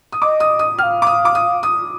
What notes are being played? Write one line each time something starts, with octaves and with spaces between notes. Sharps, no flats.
D#6
D#5 D6
D#6
D#6
G5 F6
F5
D6
D#6
D6
D#6
D#6